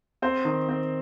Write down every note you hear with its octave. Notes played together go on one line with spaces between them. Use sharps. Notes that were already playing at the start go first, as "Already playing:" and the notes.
C4 C5
D#3
C4